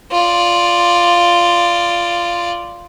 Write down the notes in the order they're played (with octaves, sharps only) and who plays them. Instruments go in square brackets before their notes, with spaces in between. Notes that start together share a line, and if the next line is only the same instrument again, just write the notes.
[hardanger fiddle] F4 D5